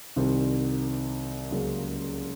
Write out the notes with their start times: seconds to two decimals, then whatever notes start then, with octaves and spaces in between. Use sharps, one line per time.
0.16 C2 C3 D#3 G3 C4
1.50 C#2 C#3 F#3 A#3